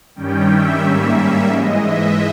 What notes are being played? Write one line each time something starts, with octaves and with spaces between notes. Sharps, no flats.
G2 D#3 G3 C#4 G5
E5
G#2 G3 A#3 C#4 E5
G#2 E3 G#3 D#5
E5